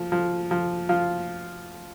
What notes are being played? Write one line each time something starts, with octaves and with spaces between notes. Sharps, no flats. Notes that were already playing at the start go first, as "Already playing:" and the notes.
Already playing: F3
F3
F3
F3 F4